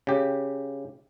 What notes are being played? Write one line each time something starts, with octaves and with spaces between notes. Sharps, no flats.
C#3 G4